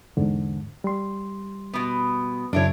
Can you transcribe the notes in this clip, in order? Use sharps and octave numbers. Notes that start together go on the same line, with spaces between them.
E2 G#2 D3
G3 C6
B2 B3
F#2 C#3 D4 E4 C#5